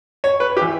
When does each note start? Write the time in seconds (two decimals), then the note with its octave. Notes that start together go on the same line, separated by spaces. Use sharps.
0.24 C#5
0.40 B4
0.57 G4
0.61 E3